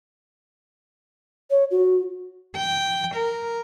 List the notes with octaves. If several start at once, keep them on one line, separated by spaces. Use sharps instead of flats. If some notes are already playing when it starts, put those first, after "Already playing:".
C#5
F#4
G5
A#4